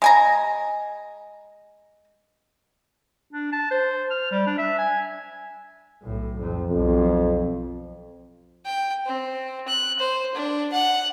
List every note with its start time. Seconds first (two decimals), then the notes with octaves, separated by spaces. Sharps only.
0.02 G#3 G#5 A#5
3.33 D4
3.52 A5
3.71 C5
4.11 F6
4.31 G3
4.47 D4
4.58 E5
4.78 G#5
6.03 B1 A2
6.40 F2
6.70 B1 F2
8.65 G5
9.06 C4
9.68 F#6
9.99 C5
10.34 D4
10.72 F#5